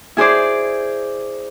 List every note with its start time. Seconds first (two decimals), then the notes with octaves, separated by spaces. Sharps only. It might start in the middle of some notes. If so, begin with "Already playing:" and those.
0.17 E4 G#4 C5 D5